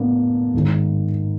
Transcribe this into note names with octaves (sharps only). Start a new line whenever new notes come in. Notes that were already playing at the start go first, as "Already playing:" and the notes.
Already playing: A2 A#3 B3 D4
G#2 D#3